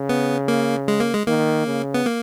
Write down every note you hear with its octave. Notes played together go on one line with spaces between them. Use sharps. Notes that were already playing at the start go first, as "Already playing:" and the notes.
Already playing: C#3
B3
A#3
G#3
A#3
G#3
D#3 A#3
C#3
B3
A#3